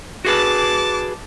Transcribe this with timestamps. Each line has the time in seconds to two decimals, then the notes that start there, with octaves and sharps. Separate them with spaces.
0.25 F#4 G#4 B4 A5 D6